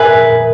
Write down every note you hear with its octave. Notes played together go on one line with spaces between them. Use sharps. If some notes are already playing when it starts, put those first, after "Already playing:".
Already playing: G#4 A#4 B4 E5